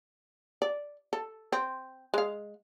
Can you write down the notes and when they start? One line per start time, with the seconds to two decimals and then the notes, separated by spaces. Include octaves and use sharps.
0.62 D5
1.13 A4
1.52 C4
2.14 G#3 F5